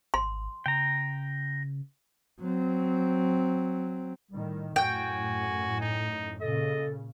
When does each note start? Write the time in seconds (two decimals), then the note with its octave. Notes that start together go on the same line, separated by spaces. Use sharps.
0.14 G#1 C6
0.66 C#3 G5 A#5
2.41 F#3 C4
4.31 A2 D#3 G3
4.76 F#2 A2 F#4 G5 G#5
5.80 D#4
6.41 A#2 C#3 A4 D#5